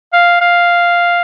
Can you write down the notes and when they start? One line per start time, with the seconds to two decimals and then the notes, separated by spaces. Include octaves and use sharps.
0.13 F5
0.41 F5